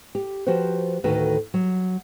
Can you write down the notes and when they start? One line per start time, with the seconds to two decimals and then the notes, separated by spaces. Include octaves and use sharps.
0.15 G4
0.47 F3 F#4 G4 B4 C5
1.04 D2 A2 D#3 A3 F#4 B4
1.54 F#3